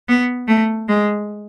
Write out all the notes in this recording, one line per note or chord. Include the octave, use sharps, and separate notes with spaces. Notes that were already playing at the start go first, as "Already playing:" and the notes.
B3
A3
G#3